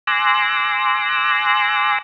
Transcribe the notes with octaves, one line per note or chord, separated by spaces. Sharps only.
G#5 C6 D6 E6 F#6 A#6